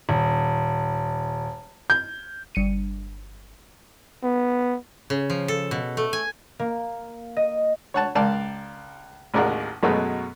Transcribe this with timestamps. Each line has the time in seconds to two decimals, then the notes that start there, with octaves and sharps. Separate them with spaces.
0.09 D#1
1.90 G6
2.55 G1 C#7 D#7
4.23 B3
5.10 C#3
5.30 F3
5.48 A4
5.71 B2
5.97 A3
6.13 G#5
6.59 A#3
7.37 D#5
7.94 C#5 F#5 A5
8.15 C#2 A#4 D5 F5 A5
9.34 A1 D#2 G#3 A#4 D5 F#5
9.83 F#2 B2 F#3 G#3 A3 B3